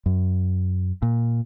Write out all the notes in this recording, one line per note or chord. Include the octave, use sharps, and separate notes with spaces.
F#2
A#2